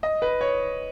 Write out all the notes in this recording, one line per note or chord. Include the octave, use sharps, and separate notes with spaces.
D#5
B4
C#5